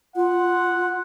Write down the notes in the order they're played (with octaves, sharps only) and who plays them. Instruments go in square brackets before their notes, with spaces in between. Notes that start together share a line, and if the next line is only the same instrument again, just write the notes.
[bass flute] F4 [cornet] F#5